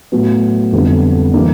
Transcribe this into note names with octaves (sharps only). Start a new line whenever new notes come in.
A2 F#3 B3
F2 D3 G3 B3
E3 G3 A#3 D4